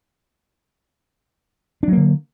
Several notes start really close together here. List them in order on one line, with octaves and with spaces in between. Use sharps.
D4 F#3 A#3 D3